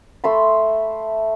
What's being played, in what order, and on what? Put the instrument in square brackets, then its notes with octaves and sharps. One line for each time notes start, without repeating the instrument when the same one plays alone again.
[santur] A3 E5 B5 C6